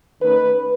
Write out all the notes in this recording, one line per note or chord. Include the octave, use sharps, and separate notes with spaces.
D#3 A3 C#4 B4